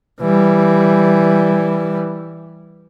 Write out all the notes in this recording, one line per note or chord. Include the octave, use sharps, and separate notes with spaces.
E3 G3